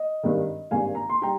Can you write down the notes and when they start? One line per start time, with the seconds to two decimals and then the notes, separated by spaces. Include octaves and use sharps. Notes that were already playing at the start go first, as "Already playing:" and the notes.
Already playing: D#5
0.23 G#1 G2 D#3
0.71 G#1 G2 D#3 F5 G#5
0.95 A#5
1.10 C6
1.22 G3 G5 A#5